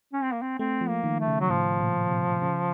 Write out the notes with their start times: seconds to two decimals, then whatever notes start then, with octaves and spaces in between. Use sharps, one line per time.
0.13 C#4
0.23 C4
0.32 A#3
0.42 C4
0.59 A3 C4
0.81 F3
0.89 A#3
1.04 D#3
1.20 A3
1.28 C#3
1.40 F#3
1.50 A2 F3
1.81 A#2
2.10 C3
2.42 C#3